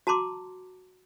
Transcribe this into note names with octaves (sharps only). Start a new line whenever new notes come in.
F#4 A5 A#5 C6 D6